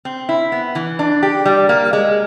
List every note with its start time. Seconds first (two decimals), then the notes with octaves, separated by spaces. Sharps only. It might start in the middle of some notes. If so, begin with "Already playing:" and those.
0.05 C4
0.29 E4
0.52 B3
0.75 E3
0.99 D4
1.23 G4
1.45 G3
1.69 A#3
1.93 G#3